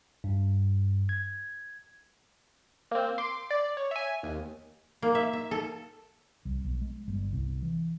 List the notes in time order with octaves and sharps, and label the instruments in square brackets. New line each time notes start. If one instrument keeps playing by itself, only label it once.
[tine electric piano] G2
G#6
[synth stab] A#3 C4
C6 D6
D5
C#5
E5 G#5
D#2
[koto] A#3
E5
E5
A4
[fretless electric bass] C2
B1
G#3
G1
C2
E3